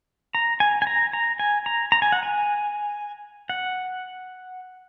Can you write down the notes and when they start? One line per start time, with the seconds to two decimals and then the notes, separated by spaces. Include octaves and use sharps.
0.35 A#5
0.60 G#5
0.82 G#5
0.87 A#5
1.13 A#5
1.39 G#5
1.66 A#5
1.92 A#5
2.02 G#5
2.12 F#5
2.23 G#5
3.50 F#5